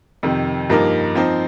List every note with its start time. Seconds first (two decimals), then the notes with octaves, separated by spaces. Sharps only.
0.23 F2 C3 D#3
0.70 G2 F3 A#3 D#4 A#4
1.15 F3 C4 D#4